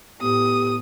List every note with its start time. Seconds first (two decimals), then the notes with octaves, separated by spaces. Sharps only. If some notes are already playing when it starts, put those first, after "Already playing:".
0.21 A2 B3 G4 D#6